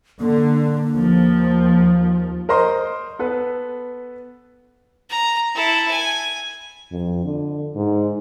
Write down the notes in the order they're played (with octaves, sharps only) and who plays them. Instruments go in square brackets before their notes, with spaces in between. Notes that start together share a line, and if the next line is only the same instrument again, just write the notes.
[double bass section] D3 [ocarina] A#3
[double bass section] D#2 F3
[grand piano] A#4 C5 D#5 C6
B3 A4 B4
[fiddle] A#5
E4 A4
G#5
[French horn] F2
D3
G#2